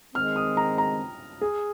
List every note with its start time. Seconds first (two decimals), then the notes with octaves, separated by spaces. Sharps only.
0.14 D#3 G#3 C4 F6
0.36 D#6
0.57 A#5
0.78 A#5
1.41 G#4